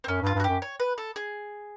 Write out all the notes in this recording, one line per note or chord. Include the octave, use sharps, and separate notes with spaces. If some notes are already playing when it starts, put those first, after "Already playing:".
C4
F#2 C#4
G2
F4
G2
F#4
F#2 G4
C#5
B4
A4
G#4